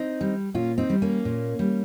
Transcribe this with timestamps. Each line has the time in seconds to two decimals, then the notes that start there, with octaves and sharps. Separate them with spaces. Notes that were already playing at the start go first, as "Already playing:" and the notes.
Already playing: C4 D#4
0.21 G3
0.54 A#2 C#4 F4
0.78 C4 D#4
0.90 G3
1.02 A#3 C#4
1.25 A#2
1.59 G3